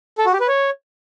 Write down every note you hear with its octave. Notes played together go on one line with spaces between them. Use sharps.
A4
F#4
G4
B4
C#5